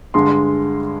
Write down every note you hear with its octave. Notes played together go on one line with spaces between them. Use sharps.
G2 D3 G#3 C6